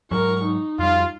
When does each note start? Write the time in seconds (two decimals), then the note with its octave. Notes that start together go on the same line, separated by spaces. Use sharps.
0.11 G#2 F#3 G#3 A#4 C#6
0.44 D#4
0.79 F2 G3 F4